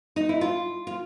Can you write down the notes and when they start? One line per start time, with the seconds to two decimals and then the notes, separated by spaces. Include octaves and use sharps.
0.16 D#4
0.29 E4
0.41 F4
0.87 F4